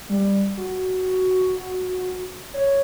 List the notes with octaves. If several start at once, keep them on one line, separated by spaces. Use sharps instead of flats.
G3
F#4
C#5